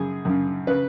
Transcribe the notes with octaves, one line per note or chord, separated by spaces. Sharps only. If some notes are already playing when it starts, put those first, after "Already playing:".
Already playing: F#2 C#3 G#4
F#2 C#3
C#3 B4